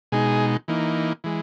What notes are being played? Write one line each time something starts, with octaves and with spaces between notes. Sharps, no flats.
B2 G#3 D#4 G#4
E3 A#3 D#4
E3 G#3